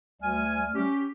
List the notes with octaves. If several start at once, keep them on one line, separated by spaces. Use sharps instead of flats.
D2 G3 A3 G#5 F6
C#4 G4